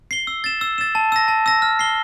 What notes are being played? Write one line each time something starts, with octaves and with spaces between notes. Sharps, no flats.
C7 G7
E6
A6 E7
E6
A6 E7
A5
E6 A#6
A5
E6 A#6
F6
C7 G7